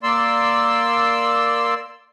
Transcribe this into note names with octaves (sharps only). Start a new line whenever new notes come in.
A#3 D5 C6 E6